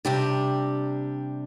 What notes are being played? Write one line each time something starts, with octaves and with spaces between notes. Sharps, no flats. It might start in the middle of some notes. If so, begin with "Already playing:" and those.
C3 G3 D4 G4